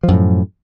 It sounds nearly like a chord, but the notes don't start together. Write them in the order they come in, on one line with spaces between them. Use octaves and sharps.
F3 F#2 A2